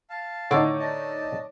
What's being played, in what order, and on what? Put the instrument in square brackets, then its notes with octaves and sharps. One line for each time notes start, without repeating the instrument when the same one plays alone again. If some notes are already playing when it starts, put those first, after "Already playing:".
[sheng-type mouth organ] F5 A5
[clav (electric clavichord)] A2 D3 [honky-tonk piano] A3 D#4 [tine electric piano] C#5 D6
[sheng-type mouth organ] D4 D#5 A5